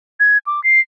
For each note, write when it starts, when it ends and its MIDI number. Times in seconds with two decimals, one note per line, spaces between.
0.20 0.38 92
0.47 0.63 86
0.64 0.80 96